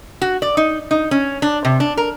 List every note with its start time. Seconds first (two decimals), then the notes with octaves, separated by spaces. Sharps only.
0.22 F#4
0.42 D5
0.57 D#4
0.91 D#4
1.11 C#4
1.42 D4
1.65 C3
1.80 D4
1.97 A#4